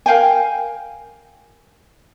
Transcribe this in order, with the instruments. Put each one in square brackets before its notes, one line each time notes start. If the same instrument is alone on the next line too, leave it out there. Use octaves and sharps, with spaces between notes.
[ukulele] A#4 F5 G5 G#5